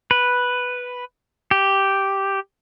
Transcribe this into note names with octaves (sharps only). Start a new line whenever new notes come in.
B4
G4